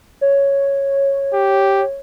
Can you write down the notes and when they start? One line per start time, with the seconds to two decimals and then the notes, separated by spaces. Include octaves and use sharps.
0.21 C#5
1.33 G4